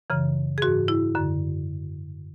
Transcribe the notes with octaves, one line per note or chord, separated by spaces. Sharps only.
F#2 C#3 E3
G#4
G#2 E3 F#4
E4
F#2 D3